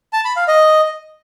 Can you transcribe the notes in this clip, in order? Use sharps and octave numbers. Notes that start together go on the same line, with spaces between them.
A5
B5
F5
D#5